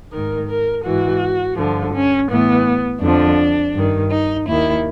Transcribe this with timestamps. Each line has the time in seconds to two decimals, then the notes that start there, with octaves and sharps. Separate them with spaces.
0.11 G#2 D#3 A#4
0.47 A#4
0.84 G#2 E3 F#4
1.57 G2 D3 F3
1.93 C#4
2.29 A2 E3 B3
3.02 F2 D3 F3 D4
3.75 G2 D#3
4.11 D#4
4.47 D#2 D#3 E4